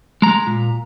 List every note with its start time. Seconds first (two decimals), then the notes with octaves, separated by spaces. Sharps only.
0.22 G#3 A#5
0.47 A#2